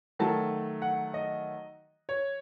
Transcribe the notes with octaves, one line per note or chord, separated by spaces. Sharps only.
D#3 F#3 A3 A5
F#5
D#5
C#5